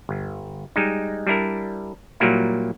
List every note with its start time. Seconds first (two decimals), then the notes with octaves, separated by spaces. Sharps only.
0.09 G1
0.76 G3 G#3 D#4
1.27 G3 D4 E4 A#4
2.20 A#2 F#3 G3 A#3 E4